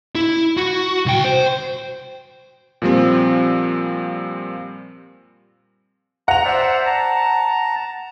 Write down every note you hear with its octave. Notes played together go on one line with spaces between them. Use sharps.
E4
F#4
C2 G5
C5
A#2 F3 G3 C4
F#5 A#5 F7
C5 D5 E5
A5 A#5